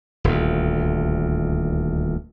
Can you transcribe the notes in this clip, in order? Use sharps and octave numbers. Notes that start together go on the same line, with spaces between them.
D#1 D2